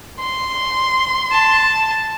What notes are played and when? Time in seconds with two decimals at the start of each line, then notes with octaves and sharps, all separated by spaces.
0.19 C6
1.31 A5